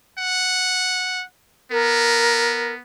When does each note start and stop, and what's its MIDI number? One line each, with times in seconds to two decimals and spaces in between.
0.19 1.25 78
1.72 2.82 59
1.72 2.73 70